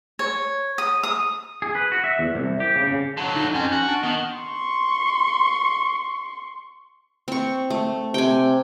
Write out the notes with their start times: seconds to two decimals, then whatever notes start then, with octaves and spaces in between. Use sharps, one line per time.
0.19 C#5
0.78 D#6
1.03 D#6
1.62 G#4
1.75 B4
1.92 F#4
2.04 E5
2.19 E2
2.35 C2
2.60 G4
2.76 C#3
2.87 C#3
3.17 D3 F#3
3.36 D#4
3.54 F2 C4 C#4
3.72 F#4
3.88 D4
4.03 D#3 B3
4.36 C6 C#6
7.28 C4 C#6
7.70 A3
8.14 C3 G5 G#5